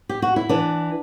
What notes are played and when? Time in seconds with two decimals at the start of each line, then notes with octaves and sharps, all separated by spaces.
0.09 G4
0.22 F#4
0.36 E4
0.49 E3 D4